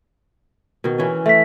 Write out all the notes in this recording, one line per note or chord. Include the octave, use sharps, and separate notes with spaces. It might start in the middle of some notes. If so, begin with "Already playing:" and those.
B2 D#3
E3 C#4
A3 E5 B6